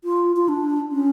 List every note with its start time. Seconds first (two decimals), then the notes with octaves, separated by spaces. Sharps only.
0.04 F4
0.36 F4
0.49 D4
0.92 C#4